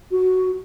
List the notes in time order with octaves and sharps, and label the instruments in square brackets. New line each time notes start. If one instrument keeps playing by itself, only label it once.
[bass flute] F#4